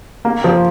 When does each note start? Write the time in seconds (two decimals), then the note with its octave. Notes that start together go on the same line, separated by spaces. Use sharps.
0.25 A#3
0.44 F3